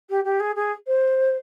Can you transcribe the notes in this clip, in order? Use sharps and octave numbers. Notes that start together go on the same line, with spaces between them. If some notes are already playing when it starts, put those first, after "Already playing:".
G4
G4
G#4
G#4
C5